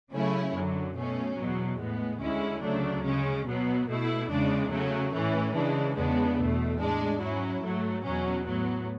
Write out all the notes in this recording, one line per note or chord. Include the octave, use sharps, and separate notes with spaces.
C#3 F#3 A3 C#4 E4
F#2 D3 F#3
B2 A3 C#4
E2 B2 F#3
A2 G#3 B3
D2 D3 G#3 C#4 E4
D2 C#3 F#3 A3 D4
C#3 G#3 C#4
B2 F#3 B3
B2 A3 E4
E2 C#3 G#3 D4
C#3 F#3 A3 C#4
A2 E3 A3 C#4
C#3 E3 G#3 D4
E2 C#3 G#3 B3 D4
E2 B2 A3
A2 G#3 D4
G#2 F#3 C#4 E4
G#2 F#3 A3
E2 B2 F#3 C#4
A2 F#3 B3